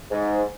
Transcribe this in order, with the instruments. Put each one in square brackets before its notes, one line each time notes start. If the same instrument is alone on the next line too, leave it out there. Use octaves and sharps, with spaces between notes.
[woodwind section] G#2